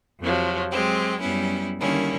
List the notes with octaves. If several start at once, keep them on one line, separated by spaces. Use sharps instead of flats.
F2 C3 F3 F#3
F#3 G#3 C4 G4
F#2 G3 B3 C#4 E4
D3 D#3 G3 A#3 C#4 E4